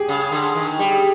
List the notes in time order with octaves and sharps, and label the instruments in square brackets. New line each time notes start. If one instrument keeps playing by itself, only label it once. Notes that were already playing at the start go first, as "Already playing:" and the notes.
Already playing: [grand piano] G4 G#4
[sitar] C#3
D3
D#3
G3